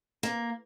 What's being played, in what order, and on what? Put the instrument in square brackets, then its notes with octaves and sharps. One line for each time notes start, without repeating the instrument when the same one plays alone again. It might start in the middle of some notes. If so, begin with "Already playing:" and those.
[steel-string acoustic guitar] A#3